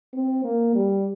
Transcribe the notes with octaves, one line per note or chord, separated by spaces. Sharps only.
C4
A#3
G3